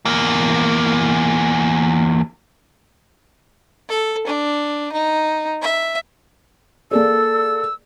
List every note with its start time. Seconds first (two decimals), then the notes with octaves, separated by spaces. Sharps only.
0.05 E2 A#3
3.89 A4
4.27 D4
4.93 D#4
5.62 E5
6.91 A#3 G#4 A4 D5 E6